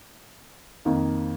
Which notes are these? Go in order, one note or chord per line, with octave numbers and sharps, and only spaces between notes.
F2 D#3 A#3 D#4